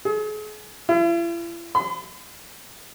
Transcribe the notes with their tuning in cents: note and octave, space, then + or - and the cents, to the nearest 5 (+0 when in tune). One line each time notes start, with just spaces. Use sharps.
G#4 +40
E4 +45
C6 -45